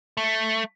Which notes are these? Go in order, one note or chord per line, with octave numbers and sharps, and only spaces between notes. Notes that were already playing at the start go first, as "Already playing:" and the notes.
A3